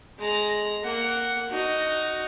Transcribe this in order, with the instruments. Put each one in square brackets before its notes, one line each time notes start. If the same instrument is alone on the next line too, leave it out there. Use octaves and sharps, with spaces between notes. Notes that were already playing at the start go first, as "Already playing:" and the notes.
[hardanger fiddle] G#3 A#5
A#3 F#5
D#4 F#4